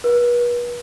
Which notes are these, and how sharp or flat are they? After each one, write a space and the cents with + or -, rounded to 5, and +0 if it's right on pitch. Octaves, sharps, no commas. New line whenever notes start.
B4 -40